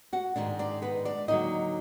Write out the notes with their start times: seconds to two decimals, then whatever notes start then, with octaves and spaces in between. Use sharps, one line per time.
0.13 F#4 F#5
0.36 G#2 D#3 G#3 D4
0.59 D4 D5
0.82 B3 B4
1.05 D4 D5
1.28 D#2 D3 F#3 D#4 D#5